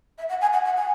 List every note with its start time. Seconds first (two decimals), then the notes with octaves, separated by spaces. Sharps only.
0.18 E5
0.29 F#5
0.41 G#5
0.53 F#5
0.65 F#5
0.76 G#5